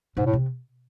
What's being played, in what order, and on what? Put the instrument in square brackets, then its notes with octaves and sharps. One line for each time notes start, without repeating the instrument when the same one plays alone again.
[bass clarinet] G#2 [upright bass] C3
[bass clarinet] A2
[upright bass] C3